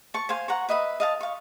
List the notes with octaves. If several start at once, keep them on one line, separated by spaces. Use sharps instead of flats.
A5 C#6
C5 F5 G#5 C6
F#5 A#5 C#6
B4 D#5 E5 B5
D#5 F5 A5
F5 C#6